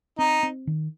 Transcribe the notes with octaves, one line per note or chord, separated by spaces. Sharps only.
C4 D#4
C4
D#3